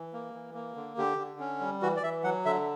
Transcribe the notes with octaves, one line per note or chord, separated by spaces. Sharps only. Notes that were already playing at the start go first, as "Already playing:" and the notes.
Already playing: E3
A#3
E3
A#3
D3
D3 G4
D3
C#4
G3
E3 F#4
D5
E3 E5
F#3 F#5
D3 E5